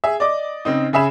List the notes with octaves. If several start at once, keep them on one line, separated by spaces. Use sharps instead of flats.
G#4 E5
D5 D#5 D6
C#3 C4 D#4
C#3 G#4 E5 B5 E7